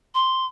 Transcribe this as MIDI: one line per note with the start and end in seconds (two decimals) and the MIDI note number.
0.15 0.46 84